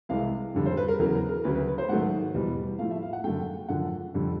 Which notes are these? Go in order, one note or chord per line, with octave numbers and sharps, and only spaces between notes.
C2 C3 E3 G#3 F5
F2 D3 G3
C5
B4
A#4
E2 C#3 F#3 A#4
A#4
A#4
D2 C#3 F#3 B4
B4
B4
C5
G#2 D#3 F#3 A3 F#5
E2 B2 G3
A2 F3 A3 F5
E5
F5
F#5
F#2 D3 F#3 A3 G5
F#2 D3 F3 F#5
F2 D3 G3